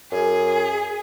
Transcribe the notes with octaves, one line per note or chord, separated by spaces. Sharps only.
F#2 G#4